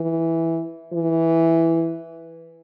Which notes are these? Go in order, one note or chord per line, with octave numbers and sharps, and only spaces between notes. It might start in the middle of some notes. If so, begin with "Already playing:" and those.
Already playing: E3
E3